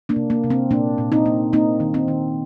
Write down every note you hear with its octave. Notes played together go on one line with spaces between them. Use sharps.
A#3 D4
C3
A#3
C3
C4
A#2 A#3 D4
A#2
C4 D#4
A#3
A#3 C4 D#4
D#3
C4
D#3